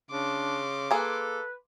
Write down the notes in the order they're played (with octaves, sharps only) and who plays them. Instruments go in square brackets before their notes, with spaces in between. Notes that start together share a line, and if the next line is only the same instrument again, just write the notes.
[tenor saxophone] C#3 [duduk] D4 [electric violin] C6 D6
[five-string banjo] A#3 G#4 [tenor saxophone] A4 [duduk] B4